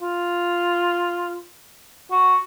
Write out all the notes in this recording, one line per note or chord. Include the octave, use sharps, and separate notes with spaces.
F4
F#4